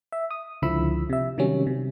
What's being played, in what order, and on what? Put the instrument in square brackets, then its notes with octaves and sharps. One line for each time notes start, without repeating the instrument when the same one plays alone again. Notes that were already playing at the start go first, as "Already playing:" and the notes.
[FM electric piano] E5
D#6
C#2 D3 F3 E4 B5 E6
C3 E5
C3 D#3 F#3 G3 C#4
C3